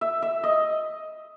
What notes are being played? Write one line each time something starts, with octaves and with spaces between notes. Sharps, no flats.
E5
E5
D#5